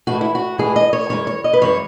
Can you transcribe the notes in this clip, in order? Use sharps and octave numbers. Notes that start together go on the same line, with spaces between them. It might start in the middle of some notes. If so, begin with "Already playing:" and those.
A2 E3 G#3 F#4
E4
F#4
A2 E3 G#3 G#4
D#5
C#5
F#2 E3 G#3 C#5
C#5
D#5
B4
F#2 E3 G#3 C#5